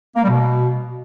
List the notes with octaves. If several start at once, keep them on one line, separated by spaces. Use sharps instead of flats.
A#3
G3
B2